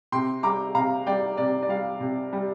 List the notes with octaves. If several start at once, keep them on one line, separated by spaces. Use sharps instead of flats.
C3 G5 C6
G3 A#5 D6
C3 F5 A#5
G3 D5 G5
C3 D5
D5
G3 F5
C3
G3